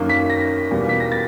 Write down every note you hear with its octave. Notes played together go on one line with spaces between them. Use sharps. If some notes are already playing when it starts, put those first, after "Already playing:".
Already playing: F#2 D#3 F#3 A#3
B6
A#6
E2 B2 G3 A#3
B6
A#6
A6